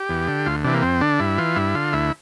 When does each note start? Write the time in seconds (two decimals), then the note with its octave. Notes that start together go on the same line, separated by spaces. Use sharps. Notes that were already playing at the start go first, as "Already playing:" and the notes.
Already playing: G4
0.09 E2
0.28 D3
0.46 D2 F4
0.64 C3 E3 D4
0.74 A#3
0.82 F2 C4
1.01 D3 D4
1.20 G2 E4
1.38 E3 F4
1.56 G2 E4
1.75 D3 F4
1.93 D2 E4